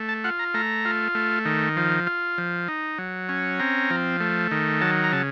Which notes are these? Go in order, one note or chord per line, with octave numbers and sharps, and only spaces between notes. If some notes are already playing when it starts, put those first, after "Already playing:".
Already playing: A3
A5
F4 F#5
A#5
A3 A#5
F4
A3
D#3
F3
F4
F3
D#4
F#3
C#4
C4 A#5
F3
A3
D#3
F#3 A5
A#5
C#3 A5